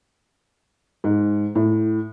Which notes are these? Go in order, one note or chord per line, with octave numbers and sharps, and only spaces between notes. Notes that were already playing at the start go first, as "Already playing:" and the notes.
G#2
A2